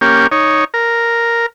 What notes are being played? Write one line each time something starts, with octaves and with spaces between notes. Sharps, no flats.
A#3 C#4 G4
D#4 C#5
A#4